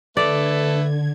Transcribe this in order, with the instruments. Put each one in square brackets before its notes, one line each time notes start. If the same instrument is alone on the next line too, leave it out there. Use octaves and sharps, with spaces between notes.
[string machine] D3 G#6 [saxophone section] A3 A4 B4 [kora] D5